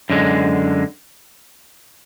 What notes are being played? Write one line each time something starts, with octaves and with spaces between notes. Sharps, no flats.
F#2 D3 G#3